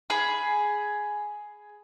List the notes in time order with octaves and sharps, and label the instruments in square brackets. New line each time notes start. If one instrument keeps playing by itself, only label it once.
[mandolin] G#4 B5